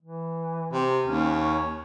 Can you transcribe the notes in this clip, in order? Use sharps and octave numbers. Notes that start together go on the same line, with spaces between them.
E3
C3
D#2 C#4
C#5